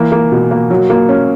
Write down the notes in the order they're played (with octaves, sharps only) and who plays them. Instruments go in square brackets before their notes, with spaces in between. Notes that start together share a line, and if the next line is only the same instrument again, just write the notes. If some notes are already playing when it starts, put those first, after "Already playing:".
Already playing: [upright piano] E3 A#3
A#3
B2
A#3
F#3
A#3
C#4